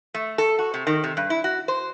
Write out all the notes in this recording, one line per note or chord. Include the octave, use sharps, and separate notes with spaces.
A3
A4
F#4
C3
D#3
C3
G2
E4
F#4
C5